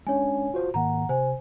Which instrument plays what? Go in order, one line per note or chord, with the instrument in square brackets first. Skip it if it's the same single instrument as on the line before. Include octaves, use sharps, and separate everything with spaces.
[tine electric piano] G#3 C#4 D4 [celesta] C#5 G#5
[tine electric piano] F4 F#4 C5
[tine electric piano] G#2 D#3 A#3 [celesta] F#5 A#5
[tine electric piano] C3 [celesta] C5 G#5